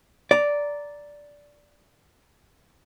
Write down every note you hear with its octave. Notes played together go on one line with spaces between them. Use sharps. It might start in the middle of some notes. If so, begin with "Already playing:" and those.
D5 A#5